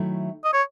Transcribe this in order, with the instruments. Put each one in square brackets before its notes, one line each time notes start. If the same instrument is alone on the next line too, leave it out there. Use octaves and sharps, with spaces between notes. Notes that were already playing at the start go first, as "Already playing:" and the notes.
Already playing: [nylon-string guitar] D#3 F#3 A3 E4
[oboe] D#5
C#5